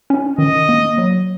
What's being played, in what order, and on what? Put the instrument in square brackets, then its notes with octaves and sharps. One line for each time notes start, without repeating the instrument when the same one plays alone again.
[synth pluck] C#4
[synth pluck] D#3 [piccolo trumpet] D#5
[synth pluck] A#3
F#3